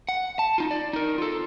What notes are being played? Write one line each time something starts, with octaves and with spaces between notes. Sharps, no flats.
F#5
A5
D#4 F4
D5
D#4 A#4
F4 A4